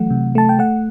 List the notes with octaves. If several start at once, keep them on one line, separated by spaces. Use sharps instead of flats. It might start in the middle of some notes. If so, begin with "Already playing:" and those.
Already playing: E3 F#3 A3 F#5
C3
A3 A5
G5
A3 F#5